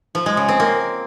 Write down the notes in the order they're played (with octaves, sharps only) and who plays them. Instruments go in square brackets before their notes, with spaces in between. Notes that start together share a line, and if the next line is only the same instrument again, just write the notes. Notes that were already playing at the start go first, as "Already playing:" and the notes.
[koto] F3
G#3
C#3
C4
A#3